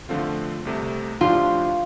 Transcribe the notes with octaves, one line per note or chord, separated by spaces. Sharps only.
D3 F3 A3 C4 F4
C2 C3 A3
A2 F3 D4 F4 G4